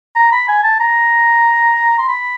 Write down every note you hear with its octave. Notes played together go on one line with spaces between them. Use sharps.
A#5
B5
G#5
A5
A#5
C6
B5